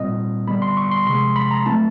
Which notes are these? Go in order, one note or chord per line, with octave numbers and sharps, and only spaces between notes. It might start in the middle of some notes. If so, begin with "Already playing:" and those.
Already playing: A#2 G3 C4 D#5
D3 G3 B3 B5
C6
C#6
C6
C3 F3 G#3 C6
B5
A#5
F#3 A3 C4 E4 A5